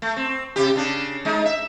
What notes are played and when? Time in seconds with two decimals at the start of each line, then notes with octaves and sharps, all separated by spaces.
0.02 A3
0.16 C4
0.56 C3 G4
0.76 C#3 D4
1.25 G#3 D#4
1.45 E5